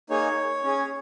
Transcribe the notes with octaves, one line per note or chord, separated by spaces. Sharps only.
A#3 D#4 G#4 C#5
C#4 G#4